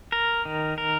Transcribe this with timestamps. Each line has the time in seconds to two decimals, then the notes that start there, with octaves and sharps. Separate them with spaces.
0.12 A#4
0.45 D#3
0.78 A#4